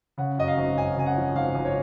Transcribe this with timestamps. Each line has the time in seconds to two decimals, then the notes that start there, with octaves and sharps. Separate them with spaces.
0.18 C#3 F#5
0.38 F#2 D#5
0.48 F5
0.57 G#1
0.77 F#2 G#5
0.96 C#3 G#5
1.06 F#5
1.17 F3
1.35 G#1 F5
1.55 G#1
1.65 C#5